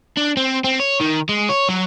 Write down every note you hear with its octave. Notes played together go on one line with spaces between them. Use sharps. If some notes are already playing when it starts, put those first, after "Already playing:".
D4
C4
C4
C#5
D#3
G#3
C#5
F#3